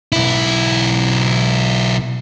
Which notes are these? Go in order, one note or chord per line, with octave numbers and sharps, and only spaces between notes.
B1 E4